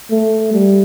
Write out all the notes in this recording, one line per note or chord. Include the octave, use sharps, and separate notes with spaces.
A3
G3